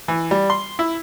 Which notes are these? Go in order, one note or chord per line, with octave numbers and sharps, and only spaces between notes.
E3
G3
C6
E4